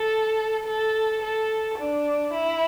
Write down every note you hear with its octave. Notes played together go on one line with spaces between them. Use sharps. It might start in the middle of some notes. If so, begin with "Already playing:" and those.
Already playing: A4
A4
A4
D4
E4